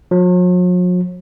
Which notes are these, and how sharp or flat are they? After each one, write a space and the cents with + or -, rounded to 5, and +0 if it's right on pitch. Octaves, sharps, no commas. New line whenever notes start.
F#3 -45